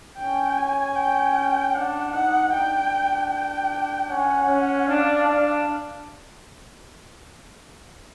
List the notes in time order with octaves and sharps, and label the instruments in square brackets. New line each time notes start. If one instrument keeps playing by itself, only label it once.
[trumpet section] C#4 [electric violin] G5
[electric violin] G#5
G5
[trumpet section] D4 [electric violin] F#5
[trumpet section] D#4 [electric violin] F#5
[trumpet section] D4 [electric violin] G5
[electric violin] G5
[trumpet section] C#4 [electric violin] F#5
[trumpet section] C#4
[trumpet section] D4 [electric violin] F5
[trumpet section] D4